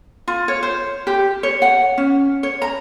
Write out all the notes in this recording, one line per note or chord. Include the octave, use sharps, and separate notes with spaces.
F4
C#5
C5
G4
C#5
F#5
C#4
C#5
A#5